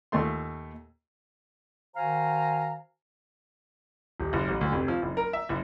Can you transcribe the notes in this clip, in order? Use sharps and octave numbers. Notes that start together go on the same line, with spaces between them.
D#2 A#2 A3 C6
D#3 F#4 C5 F5 G#5 A#5
D#1
F#1
A1
D2
F1
F3
F#1
A#4
E5
F#1